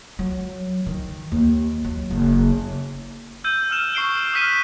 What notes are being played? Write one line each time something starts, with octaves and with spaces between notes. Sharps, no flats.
F#3
D#3
D#2
F#3
F#1
E6 G6 D#7
E6 F6 E7
C#6 C7 D7 G7
D#6 F6 F#6 B6 C7 D#7